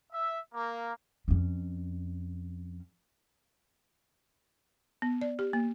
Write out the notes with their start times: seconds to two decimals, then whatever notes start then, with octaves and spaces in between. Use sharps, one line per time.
0.13 E5
0.53 A#3
1.28 F2 C#4
5.02 B3
5.21 D5
5.39 G4
5.53 A#3